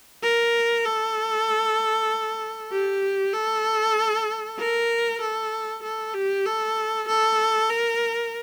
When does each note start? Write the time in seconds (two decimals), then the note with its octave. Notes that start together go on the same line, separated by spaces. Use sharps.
0.22 A#4
0.85 A4
2.72 G4
3.33 A4
4.59 A#4
5.21 A4
5.83 A4
6.14 G4
6.46 A4
7.08 A4
7.70 A#4